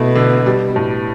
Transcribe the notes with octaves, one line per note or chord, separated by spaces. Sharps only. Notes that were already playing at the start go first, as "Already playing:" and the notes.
Already playing: B2 A3 E4
D3
G3
A2